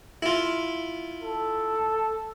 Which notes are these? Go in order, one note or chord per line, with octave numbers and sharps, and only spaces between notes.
E4 F4
A4